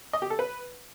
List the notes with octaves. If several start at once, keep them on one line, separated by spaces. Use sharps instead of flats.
D#5
G4
A4
B4